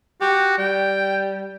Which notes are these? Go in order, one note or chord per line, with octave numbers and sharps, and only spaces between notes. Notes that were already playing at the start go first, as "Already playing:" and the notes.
F#4 G4
G3 G5